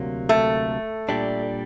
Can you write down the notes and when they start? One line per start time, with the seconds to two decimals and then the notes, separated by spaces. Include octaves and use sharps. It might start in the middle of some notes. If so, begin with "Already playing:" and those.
Already playing: D2 C3 F#3 A#3
0.29 A3
1.09 A#2 G3 D4